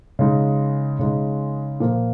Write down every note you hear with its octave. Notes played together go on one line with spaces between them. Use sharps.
C#3 G#3 D#4
C#3 G#3 D#4
A#2 F3 A#3